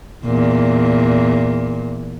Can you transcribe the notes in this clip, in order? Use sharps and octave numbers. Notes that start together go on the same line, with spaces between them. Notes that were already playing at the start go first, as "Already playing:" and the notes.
E2 A#2